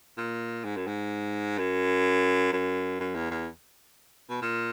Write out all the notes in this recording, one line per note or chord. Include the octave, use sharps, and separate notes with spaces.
A#2
G#2
F#2
G#2
F#2
F#2
F#2
E2
E2
B2
A#2